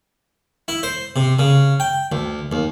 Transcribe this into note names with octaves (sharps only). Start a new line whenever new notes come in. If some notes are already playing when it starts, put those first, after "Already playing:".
E4
C5
C3
C#3
G5
D2
D#2